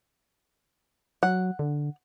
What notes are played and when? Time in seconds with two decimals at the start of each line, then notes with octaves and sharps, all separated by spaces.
1.23 F#3 F#5
1.59 D3